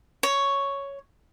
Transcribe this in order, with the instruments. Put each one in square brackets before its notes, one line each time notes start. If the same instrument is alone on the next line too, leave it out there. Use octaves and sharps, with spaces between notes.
[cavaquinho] C#5